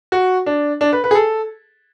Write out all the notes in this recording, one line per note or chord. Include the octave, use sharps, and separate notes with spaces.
F#4
D4
D4
B4
B4
G#4
A4